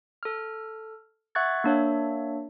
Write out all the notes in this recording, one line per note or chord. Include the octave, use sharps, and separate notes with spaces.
A4 F6
E5 F#5 C#6 F#6 G#6 A6
A#3 D4 C#5 E5